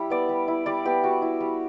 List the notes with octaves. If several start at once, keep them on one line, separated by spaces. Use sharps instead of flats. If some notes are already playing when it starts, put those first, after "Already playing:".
Already playing: G3 E4
B3 D5
G3
E4
G3 D5
B3 G4
G3 F#4
E4
G3